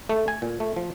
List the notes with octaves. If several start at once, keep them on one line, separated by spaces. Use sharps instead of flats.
A3
G#5
A#2
A3
F3